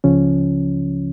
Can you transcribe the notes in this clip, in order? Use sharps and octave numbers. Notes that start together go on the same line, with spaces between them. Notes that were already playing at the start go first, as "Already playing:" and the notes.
C#2 C#3 F3 C#4